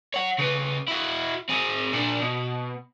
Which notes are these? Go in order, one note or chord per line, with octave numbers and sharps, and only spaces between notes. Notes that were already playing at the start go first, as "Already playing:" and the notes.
C#5 F#5
C#3 B4
E4 F#4
C4 G#4
A#2 D4
B2